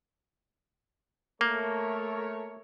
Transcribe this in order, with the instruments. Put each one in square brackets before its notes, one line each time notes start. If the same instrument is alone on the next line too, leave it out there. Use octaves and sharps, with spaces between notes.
[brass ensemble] A3 A#4 C#5 [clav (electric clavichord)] A#3